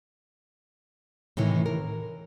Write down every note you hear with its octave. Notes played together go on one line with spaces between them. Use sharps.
A2 C3 D#3 E3
A#4